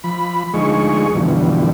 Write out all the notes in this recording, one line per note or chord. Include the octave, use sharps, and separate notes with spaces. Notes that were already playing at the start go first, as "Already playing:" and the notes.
F3 B5
D2 F3 G#3 D#4 G#4 C#6
F#2 B2 D3 E3 F3 G3